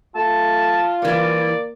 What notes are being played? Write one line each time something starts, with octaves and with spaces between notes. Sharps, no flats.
A3 F4 A5
E3 G3 A#3 D5